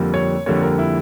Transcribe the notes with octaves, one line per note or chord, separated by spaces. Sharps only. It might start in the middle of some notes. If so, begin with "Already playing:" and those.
Already playing: F2 D3 G3 A#3
C#5
F2 D3 G3 A#3 C#5
A#4
E4